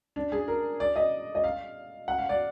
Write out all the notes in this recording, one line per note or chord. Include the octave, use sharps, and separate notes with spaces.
D4
G#4
A#4
D5
D#5
D#5
F5
F#5
F5
D5